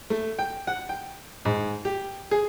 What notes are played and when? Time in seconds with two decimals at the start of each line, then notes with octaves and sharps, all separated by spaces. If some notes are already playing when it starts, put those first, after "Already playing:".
0.10 A3
0.39 G5
0.67 F#5
0.89 G5
1.45 G#2
1.85 G4
2.31 G#4